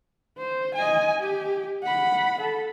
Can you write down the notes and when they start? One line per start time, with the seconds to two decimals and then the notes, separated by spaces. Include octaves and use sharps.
0.38 C5
0.75 D#5 G#5
1.21 G4
1.83 F#5 B5
2.41 A4